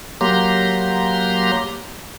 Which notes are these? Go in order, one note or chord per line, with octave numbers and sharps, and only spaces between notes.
F#3 A#3 G4 A#5 C6